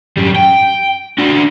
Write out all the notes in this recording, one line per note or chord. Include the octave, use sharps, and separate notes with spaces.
F#2 G3
G5
D4 F#4